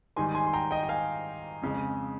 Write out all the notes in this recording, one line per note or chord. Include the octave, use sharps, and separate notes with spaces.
G#2 D#3 G3 G#5 C6
G#5 C6
C6
G5 A#5
D#5 G5
G5
F5 G#5
F2 C#3 G#3